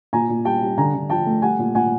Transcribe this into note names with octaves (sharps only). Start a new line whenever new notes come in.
A#2 G#5 A#5
A#2
G3 G5 A5
G3
D3 G#5 A#5
D3
F3 G5 A5
A3
G3 F#5 G#5
A#2
A#2 F#5 G#5